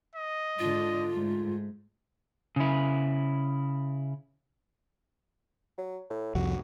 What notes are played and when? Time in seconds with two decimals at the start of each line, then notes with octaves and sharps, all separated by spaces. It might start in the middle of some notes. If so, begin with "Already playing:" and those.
0.16 D#5
0.59 G#2 D3 D4 F4
1.11 G#2 A3
2.56 C#3 E4
5.78 F#3
6.10 A2
6.35 C2 F2 F#4